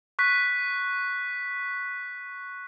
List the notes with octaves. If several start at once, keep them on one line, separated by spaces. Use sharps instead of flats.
C#6 F#6 B6